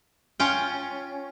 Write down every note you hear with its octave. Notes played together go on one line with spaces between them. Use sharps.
C#4 F4 G5